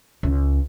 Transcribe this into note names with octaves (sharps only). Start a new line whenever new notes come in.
C#2